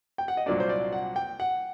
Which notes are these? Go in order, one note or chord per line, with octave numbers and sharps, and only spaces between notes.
G5
F#5
D#5
C2 A#2 F#3 A#3 D4 D5
C5
D5
F#5
G5
F#5